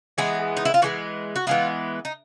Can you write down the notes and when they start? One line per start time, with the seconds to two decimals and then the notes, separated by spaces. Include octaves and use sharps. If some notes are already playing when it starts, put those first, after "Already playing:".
0.18 E3 G#3 B3 G#4
0.57 D#4
0.65 E4
0.74 F4
0.82 E3 G#3 B3 F#4
1.36 F#4
1.47 E3 G#3 B3 F4
2.05 D#4